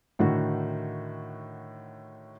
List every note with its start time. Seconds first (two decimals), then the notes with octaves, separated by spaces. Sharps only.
0.19 A2 D3 D#3 F#4